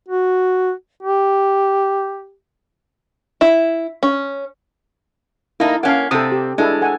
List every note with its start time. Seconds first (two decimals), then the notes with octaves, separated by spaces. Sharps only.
0.08 F#4
1.03 G4
3.41 E4
4.03 C#4
5.60 A#3 D#4 E4 A5
5.83 A#3 C#4 F5 F#5
6.11 C3 C4 A4 D#6
6.32 G4
6.58 G#3 D4 E4 A4
6.81 A4 F#5 G#5